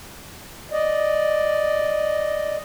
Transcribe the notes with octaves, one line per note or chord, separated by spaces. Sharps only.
D5 D#5